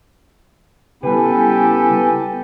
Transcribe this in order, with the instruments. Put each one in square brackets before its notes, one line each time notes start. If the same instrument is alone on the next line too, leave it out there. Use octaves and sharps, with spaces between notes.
[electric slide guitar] C#3 G3 [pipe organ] B3 E4 G#5 [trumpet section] G4 A4 [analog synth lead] B4